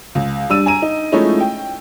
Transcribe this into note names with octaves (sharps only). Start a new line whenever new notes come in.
C#2
G3 D4 E6 D#7
G#5 A#5 D#7
D#4
F3 G#3 A3 C#4 D#4 E4
G5